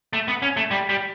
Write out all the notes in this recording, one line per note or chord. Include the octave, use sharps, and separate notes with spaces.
A3
B3
C#4
A3
G3
G3